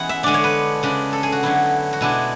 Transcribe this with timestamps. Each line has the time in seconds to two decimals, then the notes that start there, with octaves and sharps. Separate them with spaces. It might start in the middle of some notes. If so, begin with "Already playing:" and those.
Already playing: E3 G#3 B3 C#4 E4 F#5
0.09 E5
0.23 D3 G#3 D4 D5
0.34 C#5
0.44 B4
0.83 C#3 G#3 D4
1.13 A4
1.23 G#4
1.32 F#4
1.43 D3 F#3 B3 E4
1.93 F#4
2.01 B2 G#3 D4 E4